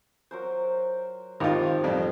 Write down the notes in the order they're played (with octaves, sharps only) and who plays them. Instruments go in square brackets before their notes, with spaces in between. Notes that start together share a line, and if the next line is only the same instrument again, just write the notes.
[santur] F#3 A#4 C5
[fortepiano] G#1 F4 [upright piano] D#3 D#5 [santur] F3 G4
[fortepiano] A1 F2 G3